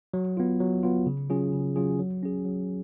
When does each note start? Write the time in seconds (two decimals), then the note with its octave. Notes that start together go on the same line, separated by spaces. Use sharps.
0.14 F#3
0.37 B3 F4
0.60 F#3
0.83 B3 F4
1.06 C#3
1.30 F#3 C#4 F4 G#4
1.53 C#3
1.76 F#3 C#4 F4 G#4
1.99 F#3
2.23 C#4 G#4
2.45 F#3